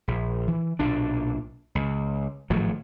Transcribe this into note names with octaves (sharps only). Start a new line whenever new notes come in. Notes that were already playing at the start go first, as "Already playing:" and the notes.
A#1
E3
B1 A#2 D4
C#2
G#1 A2 F3 F#3